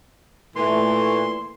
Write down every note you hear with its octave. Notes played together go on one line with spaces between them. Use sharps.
A#2 E3 A3 C6